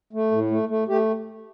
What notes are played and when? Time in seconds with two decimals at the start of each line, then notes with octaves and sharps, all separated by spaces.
0.13 A3
0.31 A2
0.51 A3
0.69 A3
0.88 A3 G4